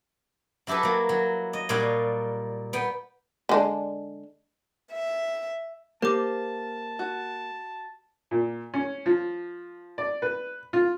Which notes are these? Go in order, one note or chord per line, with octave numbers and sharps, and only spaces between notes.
F#3 E4 G4 A4 B4
F#3 A#3
F#3
D#5
A#2 G3 C#5 F5 F#5
B3 G5
D3 G#3 D4
E5
A#3 G4 C5 A5 D6
F#4
A#2
C#4
F3
D5
B4
F4